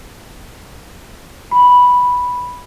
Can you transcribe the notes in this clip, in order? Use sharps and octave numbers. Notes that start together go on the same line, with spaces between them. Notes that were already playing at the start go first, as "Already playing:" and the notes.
B5